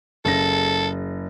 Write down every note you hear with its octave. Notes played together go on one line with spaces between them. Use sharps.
F#1 C#3 A4 A#6